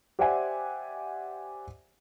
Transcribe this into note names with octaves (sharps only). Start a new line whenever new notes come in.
G4 C5 D5 E5 F#5 G#5